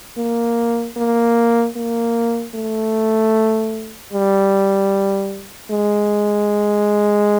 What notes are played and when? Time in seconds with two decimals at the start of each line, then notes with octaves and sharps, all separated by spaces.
0.18 A#3
0.97 A#3
1.76 A#3
2.55 A3
4.13 G3
5.71 G#3